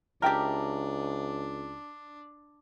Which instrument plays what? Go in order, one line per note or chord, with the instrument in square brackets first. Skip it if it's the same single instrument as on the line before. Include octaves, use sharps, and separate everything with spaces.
[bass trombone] C#2 [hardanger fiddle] D4 [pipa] G4 A#4 [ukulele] E5 G5 A5